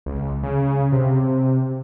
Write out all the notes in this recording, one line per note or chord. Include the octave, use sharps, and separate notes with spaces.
C#2
C#3
C3